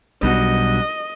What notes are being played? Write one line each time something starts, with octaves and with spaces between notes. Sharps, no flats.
B1 B2 G3 D4 F#4 D#5